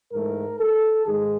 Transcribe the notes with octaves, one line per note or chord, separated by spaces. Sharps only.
G#2 E3 A3 A#4
A4
G#2 D#3 G#3 G#4